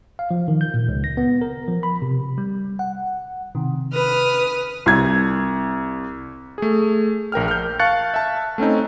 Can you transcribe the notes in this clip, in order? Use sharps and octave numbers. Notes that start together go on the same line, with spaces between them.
F5
F3
D#3
G6
A#2
C#2
A#6
B3
A#4
F3
B5
C3
G3
F#5
C3 D#3
B4 D#6 F6
C2 G#6
A3 G#4
A#1 A#4 G5 F6
F6 G6
F5 A5 C#6 F#6 A6 C#7
E5 A5
A3 C4 C#4 D#4